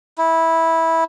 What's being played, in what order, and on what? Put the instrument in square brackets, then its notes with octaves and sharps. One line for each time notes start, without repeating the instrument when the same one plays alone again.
[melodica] E4